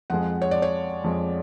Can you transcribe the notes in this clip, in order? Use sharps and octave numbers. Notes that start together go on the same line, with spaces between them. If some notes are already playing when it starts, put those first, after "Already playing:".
F2 F3 G#3 F#5
C#5
D5
C#5
F2 F3 G#3